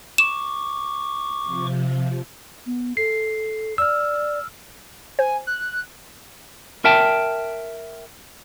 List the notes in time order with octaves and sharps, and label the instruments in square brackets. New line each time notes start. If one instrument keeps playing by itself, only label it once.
[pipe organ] C#6 D6 [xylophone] E7
[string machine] C3 F3
[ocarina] B3
[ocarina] A4 [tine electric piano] C7
[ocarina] D5 [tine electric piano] E6 F6
[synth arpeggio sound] C5 [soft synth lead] G#5
[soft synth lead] F#6
[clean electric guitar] A#4 E5 G5 A5